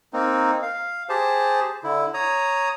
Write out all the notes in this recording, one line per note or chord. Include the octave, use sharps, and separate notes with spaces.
A#3 C4 D#4
F5
G4 G#4 C5 A5
D3 E4
C#5 A#5 D#6